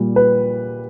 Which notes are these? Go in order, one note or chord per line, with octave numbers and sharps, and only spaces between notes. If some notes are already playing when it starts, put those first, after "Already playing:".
Already playing: A#2 G3
B4